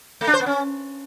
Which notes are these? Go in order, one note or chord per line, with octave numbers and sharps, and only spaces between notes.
A3
D4
C5
B3
C#4